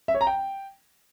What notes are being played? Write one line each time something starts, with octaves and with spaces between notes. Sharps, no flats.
E5
C#5
A#5
G5